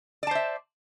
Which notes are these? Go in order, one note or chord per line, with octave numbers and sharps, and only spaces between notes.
C5 D5 E5 A5